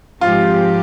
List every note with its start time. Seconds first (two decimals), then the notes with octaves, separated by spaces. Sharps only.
0.21 G#2 F3 C4 F4 G4